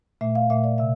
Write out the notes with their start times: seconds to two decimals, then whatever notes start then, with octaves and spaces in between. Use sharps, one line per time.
0.21 A#2 A3 E5
0.35 F5
0.50 A#2 A3 E5
0.64 D5
0.78 C3 E5